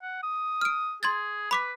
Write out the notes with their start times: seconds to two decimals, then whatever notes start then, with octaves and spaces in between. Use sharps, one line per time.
0.02 F#5
0.23 D#6
0.61 F6 D7
1.03 G#4 C6 G#6 A6
1.51 B4 B5 D6 B6